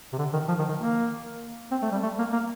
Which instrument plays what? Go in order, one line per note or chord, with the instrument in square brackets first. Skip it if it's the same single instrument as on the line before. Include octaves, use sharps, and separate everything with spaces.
[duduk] C3
D3
D#3
F3
D#3
D#3
A#3
C4
A3
G3
A3
A#3
A#3